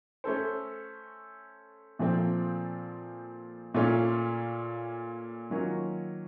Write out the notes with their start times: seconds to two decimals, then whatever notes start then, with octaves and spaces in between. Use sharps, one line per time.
0.24 A3 C#4 A4 C5
1.99 A#2 F3 A3 C4
3.74 A#2 A3 C#4 F4
5.50 D#3 F#3 A#3 C#4 F4